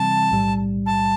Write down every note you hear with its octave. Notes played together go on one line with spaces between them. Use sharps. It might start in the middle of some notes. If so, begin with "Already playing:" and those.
Already playing: C3 E3 G3 C4 A5
B1 A2 G3
A5